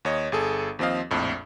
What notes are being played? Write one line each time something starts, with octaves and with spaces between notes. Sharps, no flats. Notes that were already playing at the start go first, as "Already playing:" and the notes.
D#2 C#5 D#5
G1 G#4 A4
D#2 F3 C4 D#5 F5
A#1 F2 A2